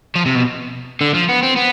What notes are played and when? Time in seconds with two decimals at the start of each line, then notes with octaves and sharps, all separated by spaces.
0.15 F3
0.26 C3
0.35 B2
1.01 D3
1.14 F3
1.29 B3
1.43 C4
1.56 B3